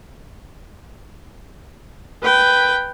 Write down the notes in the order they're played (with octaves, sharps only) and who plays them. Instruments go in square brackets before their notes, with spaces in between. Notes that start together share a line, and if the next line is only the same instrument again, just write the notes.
[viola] B4 G5